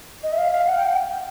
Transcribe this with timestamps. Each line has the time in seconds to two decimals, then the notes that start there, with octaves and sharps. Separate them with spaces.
0.23 D#5
0.32 E5
0.38 F5
0.52 F5
0.67 F#5
0.77 G5